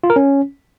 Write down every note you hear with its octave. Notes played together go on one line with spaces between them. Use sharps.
F4
A#4
C#4